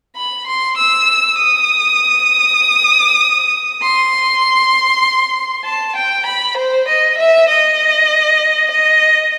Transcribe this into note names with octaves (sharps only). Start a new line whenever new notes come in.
B5
C6
E6
D#6
C6
A5
G5
B5
C5
D#5
E5
D#5
D#5